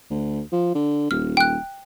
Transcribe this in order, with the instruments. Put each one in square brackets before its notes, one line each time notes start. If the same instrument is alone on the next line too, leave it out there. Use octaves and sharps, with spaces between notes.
[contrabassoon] D2
F3
D3
[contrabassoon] D#1 [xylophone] F6
[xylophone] G5 F#6